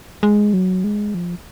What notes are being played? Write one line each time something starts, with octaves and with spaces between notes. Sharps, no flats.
G#3
F#3
G#3
F3